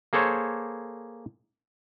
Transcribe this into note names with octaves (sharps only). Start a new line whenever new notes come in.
A#3 G#4 A4 C5 C#5